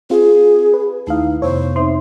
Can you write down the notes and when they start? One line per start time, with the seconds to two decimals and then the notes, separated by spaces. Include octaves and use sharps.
0.10 C4 F4 G#4
0.74 B4
1.07 D#2 A3 D#4 E4 F5 D#6
1.42 F2 C3 B3 C5 C#5
1.76 C4 D#4 E5 C6